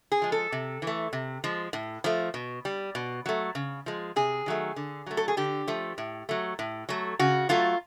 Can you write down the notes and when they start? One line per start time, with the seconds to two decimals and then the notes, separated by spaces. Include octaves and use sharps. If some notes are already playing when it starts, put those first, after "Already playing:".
0.12 G#4
0.22 F3 G#3
0.32 A4
0.52 C3
0.82 E3
0.87 A3
1.13 C3
1.44 F3 G#3
1.73 A2
2.04 F3 A3
2.34 B2
2.65 G3
2.95 B2
3.26 F#3 A3
3.55 C#3
3.86 F3 G#3
4.16 C3 G#4
4.46 D#3 F#3 A3
4.76 D3
5.06 F#3 A3
5.17 A4
5.28 G#4
5.37 D3 G4
5.68 F3 A3
5.98 A2
6.29 F#3 A3
6.59 A2
6.89 F#3 A3
7.19 C#3 F#4
7.49 F#3 A3 F4